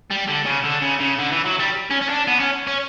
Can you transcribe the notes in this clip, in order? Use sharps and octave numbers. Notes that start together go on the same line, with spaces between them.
G3
D3
C#3
D3
C#3
C#3
D3
E3
F#3
G3
C#4
C#4
D4
B3
C#4
C#4